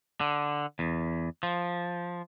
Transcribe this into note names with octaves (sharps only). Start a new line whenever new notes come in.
D3
E2
F3